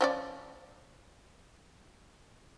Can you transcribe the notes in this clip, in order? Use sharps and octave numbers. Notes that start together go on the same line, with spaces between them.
F3 C#4 D5